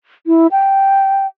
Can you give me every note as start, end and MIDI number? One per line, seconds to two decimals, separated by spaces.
0.27 0.47 64
0.52 1.27 79